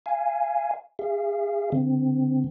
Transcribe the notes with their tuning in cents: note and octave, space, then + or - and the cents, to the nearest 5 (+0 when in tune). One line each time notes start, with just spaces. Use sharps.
F5 -25 G#5 +0
G#4 -30 F5 -40
D3 -25 C4 -20